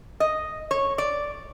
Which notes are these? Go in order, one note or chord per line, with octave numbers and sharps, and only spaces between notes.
D#5
C#5
D5